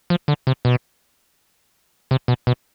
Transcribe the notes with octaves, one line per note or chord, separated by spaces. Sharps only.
F3
D3
C3
B2
C3
B2
B2